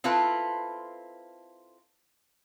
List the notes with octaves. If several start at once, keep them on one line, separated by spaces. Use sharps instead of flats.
C4 E4 F4 A4 B4